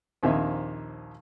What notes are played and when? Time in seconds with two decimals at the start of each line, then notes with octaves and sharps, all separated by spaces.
0.23 A#1 D#2 C4 D#4 E5